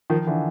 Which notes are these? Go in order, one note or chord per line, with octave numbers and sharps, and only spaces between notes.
D#3 F3
D3 E3